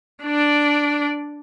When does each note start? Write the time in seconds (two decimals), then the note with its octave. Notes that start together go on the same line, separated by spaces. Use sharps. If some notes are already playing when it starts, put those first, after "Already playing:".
0.23 D4 D5